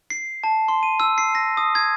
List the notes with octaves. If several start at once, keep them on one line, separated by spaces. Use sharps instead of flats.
C7
A5
C6
D#7
E6
C7
A#6
D#6
G#6